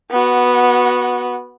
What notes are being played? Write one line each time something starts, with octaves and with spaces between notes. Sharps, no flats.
B3 F#4